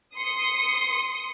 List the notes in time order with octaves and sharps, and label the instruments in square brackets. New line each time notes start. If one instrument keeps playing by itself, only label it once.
[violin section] C6 D#6 C#7